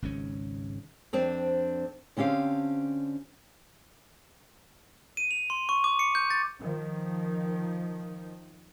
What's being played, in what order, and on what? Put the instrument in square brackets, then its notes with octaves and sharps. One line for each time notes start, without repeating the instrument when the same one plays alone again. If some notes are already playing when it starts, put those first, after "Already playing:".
[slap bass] G#1 C#2 G#2 C#4
[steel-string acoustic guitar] F2 C4 D4
D3 C4 C#4 G4 F5
[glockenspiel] D#7
F7
C6
C#6
D6
C#7
G6
A6
[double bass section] D#3 F3